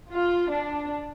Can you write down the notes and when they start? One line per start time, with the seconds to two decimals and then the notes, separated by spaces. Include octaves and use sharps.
0.12 F4
0.51 D4